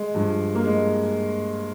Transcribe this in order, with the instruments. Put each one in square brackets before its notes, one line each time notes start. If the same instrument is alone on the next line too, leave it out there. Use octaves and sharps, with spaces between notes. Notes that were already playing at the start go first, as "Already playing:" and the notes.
Already playing: [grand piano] G#3
G2 F3
A#3
G#3